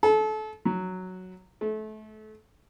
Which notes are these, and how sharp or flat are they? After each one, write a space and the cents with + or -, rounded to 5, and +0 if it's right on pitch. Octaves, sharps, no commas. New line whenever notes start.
A4 -30
F#3 +0
A3 -30